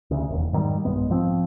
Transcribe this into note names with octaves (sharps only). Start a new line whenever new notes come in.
D2 C#3
E1 D#2
G#2 D#3 F#3 G3
B1 G2 G#3 B3
G#2 F3 C4